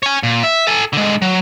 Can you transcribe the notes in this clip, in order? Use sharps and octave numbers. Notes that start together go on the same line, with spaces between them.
C#5 G#5
A#2
E5
A4 G#5
D3 G#3
F#3